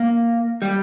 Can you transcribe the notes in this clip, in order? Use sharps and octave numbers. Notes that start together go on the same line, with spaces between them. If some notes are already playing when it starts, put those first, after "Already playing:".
Already playing: A#3
G3